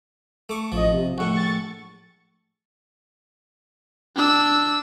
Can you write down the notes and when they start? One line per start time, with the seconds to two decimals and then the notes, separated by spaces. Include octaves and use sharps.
0.49 A3 C#6 D6
0.72 A1 F3 D#5
0.92 C3
1.18 A#1 A2 F#5 C#6
1.34 C#6 A6
4.16 D4 E6